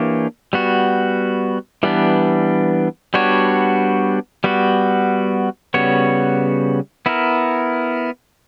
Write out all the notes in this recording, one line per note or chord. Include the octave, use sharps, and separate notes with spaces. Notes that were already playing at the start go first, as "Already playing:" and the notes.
Already playing: E3 A#3 D4 G4 C#5
G3 B3 F#4
E3 G3 B3 D4
G3 B3 D4 F#4 C#5
G3 B3 F#4
C#3 G3 B3 F#4 C#5
B3 E4 A#4